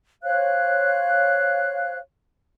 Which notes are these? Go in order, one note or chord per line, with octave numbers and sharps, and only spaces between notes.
C5 C#5 F5 F#6